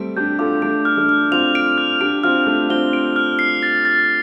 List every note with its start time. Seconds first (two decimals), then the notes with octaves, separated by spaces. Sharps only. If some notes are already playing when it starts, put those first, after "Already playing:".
Already playing: G3 A3 C4 D7
0.17 D4 G4 G6
0.39 F4 A4 D6
0.62 A3 D4 D7
0.85 F6
0.97 A3 D4
1.09 F6
1.31 C4 F4 F7
1.55 D7
1.78 F6
2.01 D4 G4 D7
2.24 C4 F4 F6
2.46 A3 D4 F6
2.69 C4 F4 G7
2.93 D7
3.16 F6
3.39 C7
3.63 A6
3.85 A6